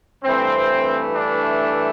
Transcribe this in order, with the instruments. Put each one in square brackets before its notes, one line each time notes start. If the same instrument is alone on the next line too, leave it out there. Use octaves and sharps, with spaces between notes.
[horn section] G2 E3 A3 C4
D4